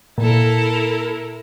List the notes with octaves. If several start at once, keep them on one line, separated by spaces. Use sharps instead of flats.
A#2 E4 A4 A#4